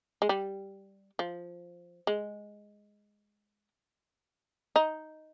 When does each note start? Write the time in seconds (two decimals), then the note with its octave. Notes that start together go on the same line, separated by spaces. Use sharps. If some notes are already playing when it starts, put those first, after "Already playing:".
0.22 G#3
0.29 G3
1.19 F3
2.07 G#3
4.76 D#4